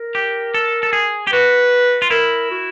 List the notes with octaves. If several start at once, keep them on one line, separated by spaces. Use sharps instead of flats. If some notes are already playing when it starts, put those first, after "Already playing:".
Already playing: A#4
G4
A4
A4
G#4
G4
F#4 B4
F4
E4 A#4
F#4